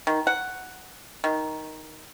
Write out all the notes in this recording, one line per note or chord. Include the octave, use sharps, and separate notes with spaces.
D#3
F#5
D#3